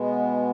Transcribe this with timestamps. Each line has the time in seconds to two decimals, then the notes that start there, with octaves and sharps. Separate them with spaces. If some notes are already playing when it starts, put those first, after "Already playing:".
Already playing: B2 G#3 B3